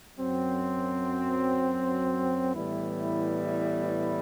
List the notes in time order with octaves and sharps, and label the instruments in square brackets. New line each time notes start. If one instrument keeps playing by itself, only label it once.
[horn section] F#2 F#3 C4
A2 E3 G3 B3 E4